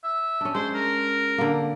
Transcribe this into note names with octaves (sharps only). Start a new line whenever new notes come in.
E5
C#4 D4
G#3 C5
A#4
D3 A#3